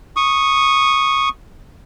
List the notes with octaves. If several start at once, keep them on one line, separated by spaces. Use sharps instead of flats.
C#6 D#6